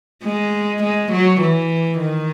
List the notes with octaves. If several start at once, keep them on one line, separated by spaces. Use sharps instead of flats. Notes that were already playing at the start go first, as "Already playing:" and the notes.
G#3
G#3
F#3
E3
D#3